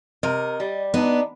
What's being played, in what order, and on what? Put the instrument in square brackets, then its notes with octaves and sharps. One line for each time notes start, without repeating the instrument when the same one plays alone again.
[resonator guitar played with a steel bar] C3 A#4 [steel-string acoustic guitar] D#5
[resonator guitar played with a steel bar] G3
[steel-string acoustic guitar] B3 [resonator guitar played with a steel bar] D4 D#4